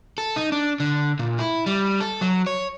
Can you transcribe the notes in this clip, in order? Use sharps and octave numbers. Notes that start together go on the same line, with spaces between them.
A4
D#4
D4
D3
A#2
E4
G3
A4
F#3
C#5